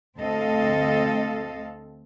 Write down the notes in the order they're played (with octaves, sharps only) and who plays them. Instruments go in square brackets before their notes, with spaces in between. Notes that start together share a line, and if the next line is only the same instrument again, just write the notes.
[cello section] D2 C4 A4 D#5 F5